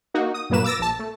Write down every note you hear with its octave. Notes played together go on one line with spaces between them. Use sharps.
A#3 D#4 F#4
D#6
G2 A#2 F#3 A#3 B4 E7
D6 E6 A6 A#6
A#1 A5
A3